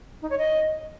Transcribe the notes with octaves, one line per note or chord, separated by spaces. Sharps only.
D#4
C#5
D#5